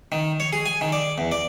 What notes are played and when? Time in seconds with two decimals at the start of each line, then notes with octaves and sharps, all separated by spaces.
0.12 D#3
0.40 C#5
0.53 G#4
0.66 G#5
0.81 D#3
0.92 D5
1.18 E2
1.32 D5